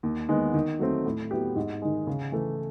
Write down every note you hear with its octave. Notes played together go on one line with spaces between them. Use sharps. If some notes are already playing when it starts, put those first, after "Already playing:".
D#2
D#3 G#3 B3
D#3
F#3 A3 C4
A2
F#3 B3 E4 G4
G#2
D#3 G#3
C#3
E3 A3